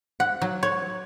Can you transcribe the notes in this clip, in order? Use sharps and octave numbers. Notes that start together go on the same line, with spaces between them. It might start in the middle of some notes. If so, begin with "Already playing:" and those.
F#5
F#3
C#5